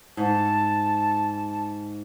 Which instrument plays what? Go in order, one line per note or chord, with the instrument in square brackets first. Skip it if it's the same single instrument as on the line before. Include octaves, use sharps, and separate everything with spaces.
[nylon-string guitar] G#2 [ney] A5